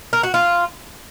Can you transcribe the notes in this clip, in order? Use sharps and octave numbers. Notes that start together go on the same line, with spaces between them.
A#4
F#4
F4